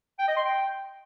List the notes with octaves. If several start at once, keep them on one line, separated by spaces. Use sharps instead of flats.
G5
D#5
C6
G5